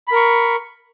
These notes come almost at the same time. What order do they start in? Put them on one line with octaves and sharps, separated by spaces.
B5 A#4 C#6